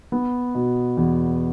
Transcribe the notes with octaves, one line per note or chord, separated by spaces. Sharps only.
B3
B2
E2